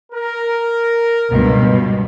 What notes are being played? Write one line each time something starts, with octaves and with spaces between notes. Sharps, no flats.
A#4
C#2 G2 B2